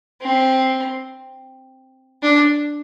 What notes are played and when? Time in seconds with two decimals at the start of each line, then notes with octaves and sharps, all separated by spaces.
0.22 C4
2.23 D4